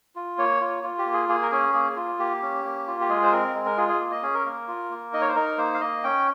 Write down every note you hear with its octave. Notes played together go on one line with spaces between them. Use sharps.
F4
A#3 C#5
F4
F4
G4
A#3
G#4
A#3 G#4
A#4
C#4 G#4
A#3 G#4
F4
A#3 G4
C#4
A#3
F4
G4
G#3 G#4
C5
C4 A#4
G#3
A#4
F4 G#4
G#4
A#3
D#5
C#4 G#4
A#4
A#3
F4
A#3
D#4 D#5
C#5
C5
D#4 A#4
A#3 C5
F5
A#3 D#5
C#4 G5